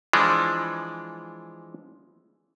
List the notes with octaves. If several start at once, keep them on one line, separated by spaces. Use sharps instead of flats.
E3 F3 G#3 D4